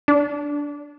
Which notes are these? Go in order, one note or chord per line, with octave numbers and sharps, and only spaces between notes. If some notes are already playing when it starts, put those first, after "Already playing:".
D4